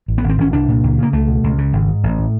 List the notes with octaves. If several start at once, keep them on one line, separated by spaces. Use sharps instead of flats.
A1
B3
G#1
C4
G#1 C#4
C2 D4
A#2
C#2
C#3 A#3
C#2 A3
B2
C#2
C#3
G#1
G#2
A1
A2